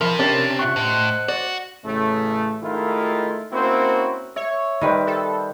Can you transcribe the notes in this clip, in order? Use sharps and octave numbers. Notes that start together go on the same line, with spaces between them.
C3 F3 A#4 E5 B5
C#4 D4 G4 A5
F4 E5 F#5 C#6
A2 C5 D#5 C6
F#4 D5
A1 A2 C#3 A3
D#3 G#3 A3 E4 F4
A#3 C4 C#4 E4 F#4 C5
C#5 E5
D#3 G3 B4 C5
A4